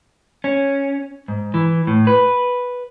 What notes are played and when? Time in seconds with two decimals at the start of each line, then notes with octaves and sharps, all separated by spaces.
0.44 C#4
1.28 G#2
1.54 E3
1.87 A2
2.07 B4